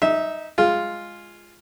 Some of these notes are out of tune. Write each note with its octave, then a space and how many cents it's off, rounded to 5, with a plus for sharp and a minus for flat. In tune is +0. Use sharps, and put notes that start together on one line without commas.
D#4 +0 E5 -20
G#3 +0 F4 +0